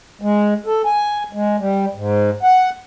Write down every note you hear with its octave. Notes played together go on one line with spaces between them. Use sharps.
G#3
A4
G#5
G#3
G3
G#2
F#5